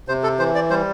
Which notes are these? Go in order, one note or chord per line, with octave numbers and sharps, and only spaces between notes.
C3 C5
A4
E3 C5
D5
G3 C5